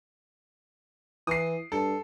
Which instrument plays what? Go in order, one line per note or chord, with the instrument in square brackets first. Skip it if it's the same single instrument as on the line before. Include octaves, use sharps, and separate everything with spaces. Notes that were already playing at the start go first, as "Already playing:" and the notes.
[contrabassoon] E3 [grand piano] D#6 C7
[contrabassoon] G2 [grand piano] A4